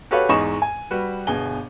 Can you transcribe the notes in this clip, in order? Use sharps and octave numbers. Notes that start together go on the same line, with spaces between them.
F#4 G4 A4 B4 C#5 F5
E2 G#2 G#3 D#5 C#6 E7
G#5
G3 F#4 B4
G1 B2 G#4 G#5 G7